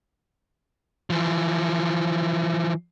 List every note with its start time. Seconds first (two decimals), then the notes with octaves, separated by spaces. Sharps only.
1.10 E3 F3